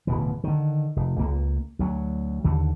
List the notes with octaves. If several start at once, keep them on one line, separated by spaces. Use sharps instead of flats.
D1 B2 E3
D3 D#3
F1
C#2 A#3
D2 F#3
D#2 D3